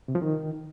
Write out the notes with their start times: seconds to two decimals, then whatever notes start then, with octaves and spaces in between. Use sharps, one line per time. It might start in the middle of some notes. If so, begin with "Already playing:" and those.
0.08 C3
0.15 F3
0.22 D#3